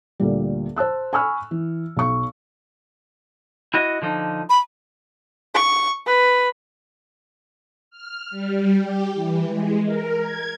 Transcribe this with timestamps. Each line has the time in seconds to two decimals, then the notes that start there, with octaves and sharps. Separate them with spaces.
0.20 D2 A#2 G3
0.76 C5 A5 E6 F#6
1.13 G#5 B5 C#6 E6 F6
1.51 E3
1.97 B1 C#6
3.74 E4 F#4 D#5
4.02 D3 F3 D#4
4.50 B5
5.55 C#6
6.07 B4
7.90 F6
8.30 G3
8.83 G4
9.15 E3
9.47 G#3
9.86 A#4
10.18 G#6